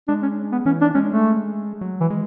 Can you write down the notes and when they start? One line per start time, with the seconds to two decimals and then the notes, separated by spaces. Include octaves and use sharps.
0.08 G#3 D4
0.22 C#4
0.52 B3
0.66 E3 C#4
0.81 D4
0.94 G#3 C#4
1.09 A3
1.81 F#3
2.01 E3
2.10 G#3